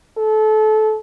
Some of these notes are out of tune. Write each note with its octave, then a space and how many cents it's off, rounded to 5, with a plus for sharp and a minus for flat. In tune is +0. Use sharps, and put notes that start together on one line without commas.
A4 -25